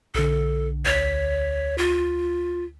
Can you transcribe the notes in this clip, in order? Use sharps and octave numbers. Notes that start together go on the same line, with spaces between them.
B1 D3 A4
D2 C#5 B6
F4